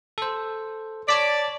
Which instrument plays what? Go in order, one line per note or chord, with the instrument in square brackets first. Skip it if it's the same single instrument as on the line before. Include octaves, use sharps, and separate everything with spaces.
[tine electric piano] A4 C5
[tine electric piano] C#5 A5 B6 [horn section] D5